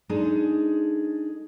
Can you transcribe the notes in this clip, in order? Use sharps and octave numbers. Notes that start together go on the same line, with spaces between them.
G#3 D4 D#4 G#4 A4